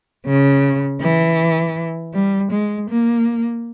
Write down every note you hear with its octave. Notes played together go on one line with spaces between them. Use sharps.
C#3
E3
G3
G#3
A#3